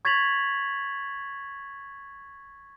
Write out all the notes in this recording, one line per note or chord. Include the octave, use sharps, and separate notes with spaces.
C#6 G#6 A6 B6 F7 F#7